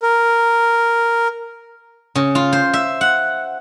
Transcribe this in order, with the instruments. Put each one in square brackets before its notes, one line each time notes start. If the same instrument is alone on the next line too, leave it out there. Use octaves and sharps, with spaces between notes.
[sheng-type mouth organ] A#4
[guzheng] C#3
F4
C5
E5
F#5